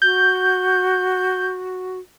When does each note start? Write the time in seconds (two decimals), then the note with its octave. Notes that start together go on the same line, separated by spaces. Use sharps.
0.02 F#4 G6